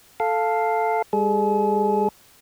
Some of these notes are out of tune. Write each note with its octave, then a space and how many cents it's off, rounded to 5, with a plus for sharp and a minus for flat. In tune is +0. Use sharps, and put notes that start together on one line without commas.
A4 +0 F5 +0
G3 +45 G#4 +45